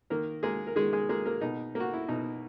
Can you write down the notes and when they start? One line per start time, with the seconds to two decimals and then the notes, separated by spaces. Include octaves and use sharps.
0.10 D#3 A#3 A#4
0.43 G#3 A#3 G#4
0.67 A#4
0.76 D#3 G#3 G#4
0.93 G#3 G#4
1.09 G#3 A#3 G#4
1.26 A#3 A#4
1.41 B2 D#4
1.75 A#3 F#4
1.94 E4
2.09 B2 D#4